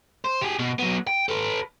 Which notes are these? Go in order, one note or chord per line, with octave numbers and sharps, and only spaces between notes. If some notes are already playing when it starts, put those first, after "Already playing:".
C5
G4 G#4
B2
F#3 B3
G5
A4 B4